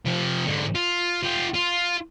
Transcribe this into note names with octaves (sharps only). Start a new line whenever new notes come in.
C3 F3
G#2 D3
F4
F4 G4
F4